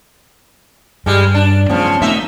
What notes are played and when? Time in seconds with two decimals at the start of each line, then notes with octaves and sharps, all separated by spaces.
1.06 G2 G3 G#3
1.34 D4
1.69 C#3 F3 B3 C#4
2.02 A#2 A3 C4 D#4 E5